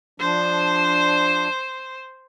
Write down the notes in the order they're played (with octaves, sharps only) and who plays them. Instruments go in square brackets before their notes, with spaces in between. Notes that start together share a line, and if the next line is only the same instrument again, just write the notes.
[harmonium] F3 D4 [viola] C5